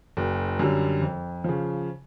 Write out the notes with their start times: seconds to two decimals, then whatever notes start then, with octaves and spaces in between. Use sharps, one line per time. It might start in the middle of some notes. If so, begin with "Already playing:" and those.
0.17 F#1
0.59 F#2 D3 G3
1.01 F2
1.44 C#3 F3